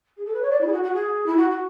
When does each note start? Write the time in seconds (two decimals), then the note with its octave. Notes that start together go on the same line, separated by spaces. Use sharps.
0.17 G#4
0.25 A4
0.34 B4
0.42 C#5
0.50 D5
0.61 E4
0.67 G#4
0.72 F#4
0.83 F#4
0.93 G#4
1.26 E4
1.37 F#4
1.50 F#4